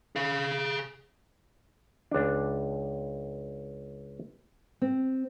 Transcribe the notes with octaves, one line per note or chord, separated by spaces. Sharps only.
G#4 F5
C#2 D4
C4